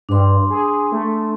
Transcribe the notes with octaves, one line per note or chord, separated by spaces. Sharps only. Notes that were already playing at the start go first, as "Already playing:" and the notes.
G2 D4 C6
G#4
A3